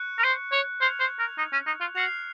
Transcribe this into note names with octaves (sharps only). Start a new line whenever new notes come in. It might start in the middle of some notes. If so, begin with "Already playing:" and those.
Already playing: C#6 F#6 C#7
A#4
C5
C#5
C5 F6 G#6 C#7 F7
C5
A#4
D#4
C#4
D#4
F4
F#4 F6 C7 F7